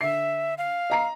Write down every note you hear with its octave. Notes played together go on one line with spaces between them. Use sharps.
D3 E5 C7
F5
D#5 A#5 C7